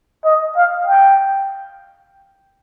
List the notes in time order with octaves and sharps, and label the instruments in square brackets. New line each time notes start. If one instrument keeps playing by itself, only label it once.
[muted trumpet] D#5
F5
G5